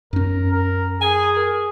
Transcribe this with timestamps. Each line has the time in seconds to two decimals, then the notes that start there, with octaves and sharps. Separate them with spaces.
0.13 F#2 C#4 A#4
0.52 A#4
1.01 G#4 G#5
1.36 A#4